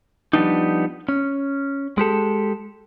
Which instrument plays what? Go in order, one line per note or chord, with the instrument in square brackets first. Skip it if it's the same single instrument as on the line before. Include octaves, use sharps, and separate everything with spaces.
[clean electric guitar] F3 G3 A3 B3 D4 D#4
C#4
G#3 G4 A4